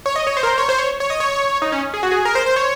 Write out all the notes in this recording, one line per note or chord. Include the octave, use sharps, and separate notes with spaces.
C#5
D#5
C#5
C5
A#4
C5
C#5
C5
C#5
C#5
D#5
C#5
D#4
C#4
G#4
F#4
G#4
A#4
C5
C5
C#5